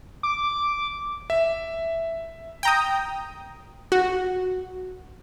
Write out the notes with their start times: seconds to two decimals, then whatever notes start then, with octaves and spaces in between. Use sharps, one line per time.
0.23 D6
1.30 E5
2.63 G5 A#5 D#6
3.92 F#4